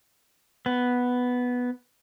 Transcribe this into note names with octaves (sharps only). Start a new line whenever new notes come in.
B3